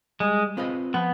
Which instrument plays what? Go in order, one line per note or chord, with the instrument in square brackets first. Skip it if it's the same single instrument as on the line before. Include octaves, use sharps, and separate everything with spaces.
[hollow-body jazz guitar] G3 [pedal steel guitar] G#3
[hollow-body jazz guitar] C4 F4 B4 D#5
[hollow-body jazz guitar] F3 [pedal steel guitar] B3